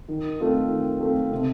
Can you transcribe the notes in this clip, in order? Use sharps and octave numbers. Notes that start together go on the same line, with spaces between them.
D#3
A3 C4 F4
D#3
A3 C4 F4
C3